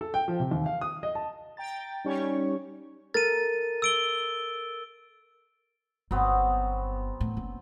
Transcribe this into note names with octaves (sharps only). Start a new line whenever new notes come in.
A4
G5
F3
C3
D#2
F5
D#6
D#5
A5
G5 A#5 A6
G3 C#4 D#4 G4 C#5 C#6
A4 A#4 A6 D#7
E6 D7 G7
G1 F#3 B3 C4
A2
F#1